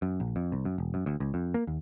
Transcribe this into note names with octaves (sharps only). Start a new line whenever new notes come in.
F#2
A#1
F2
C2
F#2
E1
F#2
D2
C#2
F2
A#3
D#2